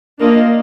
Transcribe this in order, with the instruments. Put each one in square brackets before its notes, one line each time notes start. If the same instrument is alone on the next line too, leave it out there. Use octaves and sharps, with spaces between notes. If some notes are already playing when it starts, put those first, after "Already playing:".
[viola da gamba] A#3 [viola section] D4 F4 A#4 D#5